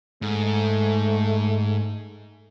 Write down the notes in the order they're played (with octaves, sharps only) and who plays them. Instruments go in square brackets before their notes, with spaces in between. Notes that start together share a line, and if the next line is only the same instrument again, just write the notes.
[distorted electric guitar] G#2 [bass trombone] A3